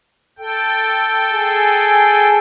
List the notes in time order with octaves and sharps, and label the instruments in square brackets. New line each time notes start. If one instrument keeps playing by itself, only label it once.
[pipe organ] A4 G5
[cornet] G#4